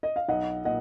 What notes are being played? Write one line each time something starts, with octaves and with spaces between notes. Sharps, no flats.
D#5
F5
B1 D#5 F#5
A#2 D#5 F#5